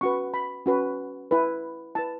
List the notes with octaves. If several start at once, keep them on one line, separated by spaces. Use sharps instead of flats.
C#4 F#4 B4 C#6
B5
C#4 F#4 B4
E4 B4
E4 B4 A5